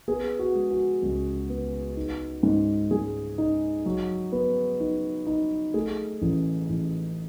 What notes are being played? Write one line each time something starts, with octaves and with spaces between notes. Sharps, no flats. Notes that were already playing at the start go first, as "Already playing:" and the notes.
B3 G#4
F#4
G#3
F#4
C#2
B3
D#4
G#2
G#2 G#4
D#4
F#3
B3
D#4
D#4
A3 G#4
A1
A1